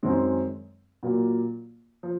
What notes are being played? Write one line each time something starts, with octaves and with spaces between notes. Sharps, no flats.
F#2 D#3 G#3 C4
A#2 F#3 A#3 F4
F3